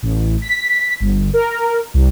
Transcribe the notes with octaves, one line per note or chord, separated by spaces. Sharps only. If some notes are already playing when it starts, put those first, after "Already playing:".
A1
B6
G1
A#4
C2